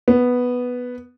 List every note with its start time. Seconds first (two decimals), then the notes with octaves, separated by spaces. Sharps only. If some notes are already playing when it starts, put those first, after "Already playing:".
0.08 B3